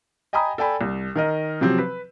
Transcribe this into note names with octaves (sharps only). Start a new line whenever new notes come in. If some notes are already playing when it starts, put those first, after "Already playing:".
D#5 G5 G#5 A#5 B5 D#6
A4 D5 G5 G#5 B5
C2
D#3 A#4 D#5
C3 F3 F#3 C4
B4